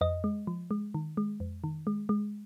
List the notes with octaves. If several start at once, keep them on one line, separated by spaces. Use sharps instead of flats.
F2 D#5
G#3
F3
G#3
D#3
G#3
F2
D#3
G#3
G#3